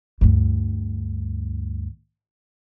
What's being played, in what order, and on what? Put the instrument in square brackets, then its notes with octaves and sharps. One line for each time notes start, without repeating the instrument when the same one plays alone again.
[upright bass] D2 G2